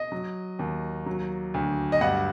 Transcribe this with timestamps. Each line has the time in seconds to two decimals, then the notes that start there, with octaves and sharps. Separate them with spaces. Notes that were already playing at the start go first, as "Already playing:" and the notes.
Already playing: D#5
0.12 F#3
0.59 D#2
1.06 F#3
1.54 D2
1.92 D#5
2.01 G2 F#5